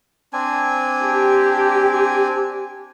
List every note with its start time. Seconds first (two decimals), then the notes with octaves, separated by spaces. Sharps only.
0.33 C4 D4 G#5
1.02 G4